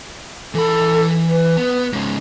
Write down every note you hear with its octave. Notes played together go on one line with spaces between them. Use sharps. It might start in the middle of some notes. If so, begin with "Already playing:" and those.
E3 A4 B5
B4
B3
G#2 C#3